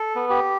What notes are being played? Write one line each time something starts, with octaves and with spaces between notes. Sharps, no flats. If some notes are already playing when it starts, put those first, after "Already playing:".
Already playing: A4
B3
G4